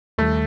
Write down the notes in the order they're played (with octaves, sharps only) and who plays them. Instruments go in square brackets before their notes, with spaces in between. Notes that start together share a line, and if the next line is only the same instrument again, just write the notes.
[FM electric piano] D#2 D#3 G3 [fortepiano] A3